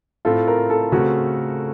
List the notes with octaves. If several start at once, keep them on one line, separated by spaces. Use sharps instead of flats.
A2 A3 C4 F4 A4
A#4
A4
C#3 A3 C4 F#4